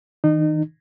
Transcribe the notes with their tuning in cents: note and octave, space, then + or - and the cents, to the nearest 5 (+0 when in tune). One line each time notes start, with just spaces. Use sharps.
D#3 +35 D#4 -30